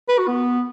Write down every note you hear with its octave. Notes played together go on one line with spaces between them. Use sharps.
B4
F#4
B3